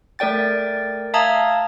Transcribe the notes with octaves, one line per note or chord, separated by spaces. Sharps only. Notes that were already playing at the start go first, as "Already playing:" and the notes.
A3 A#4 D5 G5 A6
E5 F5 A5 A#5 D#6 G#6